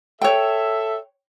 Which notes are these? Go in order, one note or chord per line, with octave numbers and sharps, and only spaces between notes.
A4 C#5 E5 G5